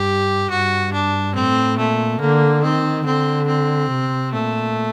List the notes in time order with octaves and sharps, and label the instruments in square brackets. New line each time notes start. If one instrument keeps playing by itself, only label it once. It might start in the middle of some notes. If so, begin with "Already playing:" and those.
Already playing: [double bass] G2 [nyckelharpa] G4
[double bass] G2 [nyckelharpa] F#4
[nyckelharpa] D4
[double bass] A2 [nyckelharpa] C4
[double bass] A#2 [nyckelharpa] A3
[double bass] D3 [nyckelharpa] A#3
[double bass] D#3 [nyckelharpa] C4
[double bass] D3 [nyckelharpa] C4
[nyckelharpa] C4
[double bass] C3
[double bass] A#2 [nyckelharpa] A3